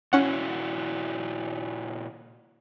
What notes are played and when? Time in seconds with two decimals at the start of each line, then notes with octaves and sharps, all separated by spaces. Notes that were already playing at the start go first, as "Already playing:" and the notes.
0.13 A#2 C#4 E4 F#4 F#5